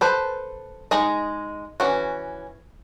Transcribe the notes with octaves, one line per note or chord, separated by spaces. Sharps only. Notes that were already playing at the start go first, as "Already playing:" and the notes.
A4 B4 C5
G#3 D#4 G#4 D#5
E3 C#4 F#4